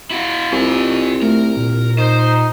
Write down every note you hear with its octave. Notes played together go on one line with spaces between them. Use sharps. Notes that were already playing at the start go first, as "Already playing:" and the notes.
E4 F#4
C2 F4 G#5
A3 A#4
A#2
D#4 C5